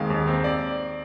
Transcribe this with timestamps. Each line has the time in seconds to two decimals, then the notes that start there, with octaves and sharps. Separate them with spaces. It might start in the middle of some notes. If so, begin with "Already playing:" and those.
Already playing: D#2 D#3 G#3 C4 F5
0.10 D#2
0.27 C4
0.44 D5